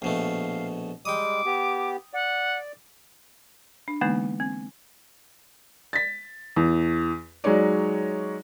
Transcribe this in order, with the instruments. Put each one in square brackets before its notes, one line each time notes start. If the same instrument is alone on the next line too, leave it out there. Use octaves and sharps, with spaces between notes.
[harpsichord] A#1 B2 A3 [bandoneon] F5
[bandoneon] G3 G#3 [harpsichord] G5 D#6 [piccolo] D6
[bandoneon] B3 G4
[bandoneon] D5 [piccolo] F#5
[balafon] D4
D3 E3 G#3 A#3 B3 D#4
C4
[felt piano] A6 B6
E2
F#3 G#3 D#4 C#5 D5